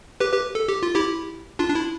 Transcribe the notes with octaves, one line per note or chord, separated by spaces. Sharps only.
G4 B4
G4 B4
A4
G4
F4
E4 G4
D4 F4
D4
E4